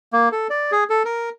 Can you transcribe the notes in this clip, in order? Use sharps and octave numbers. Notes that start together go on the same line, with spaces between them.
A#3
A4
D5
G#4
A4
A#4